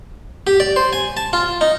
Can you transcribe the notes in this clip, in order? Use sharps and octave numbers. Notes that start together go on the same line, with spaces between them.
G4
D5
C5
G#5
A5
F4
D#4